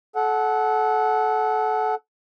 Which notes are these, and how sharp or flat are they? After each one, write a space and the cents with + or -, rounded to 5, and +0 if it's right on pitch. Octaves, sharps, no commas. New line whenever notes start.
A4 -25 F#5 +0